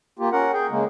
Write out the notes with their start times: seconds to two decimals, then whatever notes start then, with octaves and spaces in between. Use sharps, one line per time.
0.19 A#3 F4 G4
0.32 C#4 A#4 F#5
0.53 G#4 G5
0.70 C#3 G#3 A#3